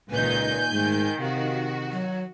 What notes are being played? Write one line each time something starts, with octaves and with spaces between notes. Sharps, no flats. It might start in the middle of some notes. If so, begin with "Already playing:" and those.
C#2 A#2 D#3 D#4 B4 G#5 G6
G#2 D#3 A3
C3 F#4 F5
F#3